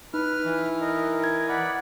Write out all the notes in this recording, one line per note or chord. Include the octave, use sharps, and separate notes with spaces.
D#4 B4 F6
E3
A#4 D#5
G#6
D5 F#5 B5